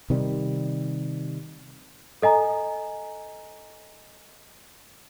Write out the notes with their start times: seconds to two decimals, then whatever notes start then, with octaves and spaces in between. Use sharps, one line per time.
0.10 C3 D#3 G3
2.22 A4 D#5 G#5 A#5